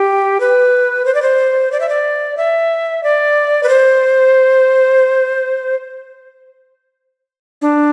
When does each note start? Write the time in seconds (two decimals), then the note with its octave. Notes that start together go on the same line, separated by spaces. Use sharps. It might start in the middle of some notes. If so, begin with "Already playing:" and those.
Already playing: G4
0.40 B4
1.06 C5
1.15 D5
1.22 C5
1.72 D5
1.80 E5
1.89 D5
2.37 E5
3.03 D5
3.63 B4
3.69 C5
7.62 D4